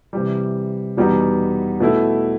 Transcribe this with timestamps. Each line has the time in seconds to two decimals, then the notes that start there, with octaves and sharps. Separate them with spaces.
0.13 C3 E3 G3
0.97 E2 B2 G3 B3 D#4
1.80 B2 A3 E4